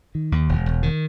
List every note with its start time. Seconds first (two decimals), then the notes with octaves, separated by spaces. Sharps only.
0.15 D#3
0.32 D#2
0.49 E1
0.66 E1
0.83 D#3